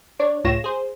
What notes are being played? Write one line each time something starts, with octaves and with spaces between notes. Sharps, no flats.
D4 C#5 D5
C#2 A2 F4 C#5 A#6 E7
G#4 C5